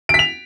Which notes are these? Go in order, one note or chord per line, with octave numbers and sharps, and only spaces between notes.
B6 D7 F7